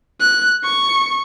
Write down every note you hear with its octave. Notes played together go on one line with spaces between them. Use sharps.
F#6
C#6